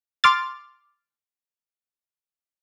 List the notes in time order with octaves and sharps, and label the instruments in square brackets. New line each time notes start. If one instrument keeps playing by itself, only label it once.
[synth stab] C6 D6 F6 A6